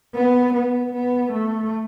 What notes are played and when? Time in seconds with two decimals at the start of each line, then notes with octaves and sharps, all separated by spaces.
0.14 B3
0.53 B3
0.93 B3
1.32 A3